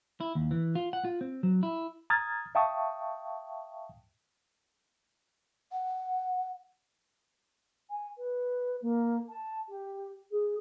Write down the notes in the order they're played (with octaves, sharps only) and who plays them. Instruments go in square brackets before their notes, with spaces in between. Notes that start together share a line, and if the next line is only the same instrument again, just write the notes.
[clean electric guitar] E4
D#2
E3
F4
F#5
F4
C4
F#3
E4
[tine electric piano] A#5 D#6 F6 G#6 A6
E5 F5 G5 A5 C#6 D#6
[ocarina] F#5
[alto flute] G#5
B4
A#3
A5
G4
G#4